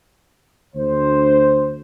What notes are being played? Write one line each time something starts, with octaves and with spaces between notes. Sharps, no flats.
D2 C5